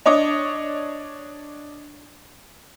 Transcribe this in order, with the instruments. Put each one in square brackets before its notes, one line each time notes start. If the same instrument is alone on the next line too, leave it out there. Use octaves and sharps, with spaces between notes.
[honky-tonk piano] D4 C#5 D#5 D6